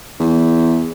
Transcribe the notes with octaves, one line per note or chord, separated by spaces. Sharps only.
E2